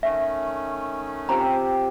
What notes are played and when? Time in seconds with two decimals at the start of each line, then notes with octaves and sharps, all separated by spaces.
0.03 D#3 A3 C#4 E5
1.29 C4 F4 G4 A#5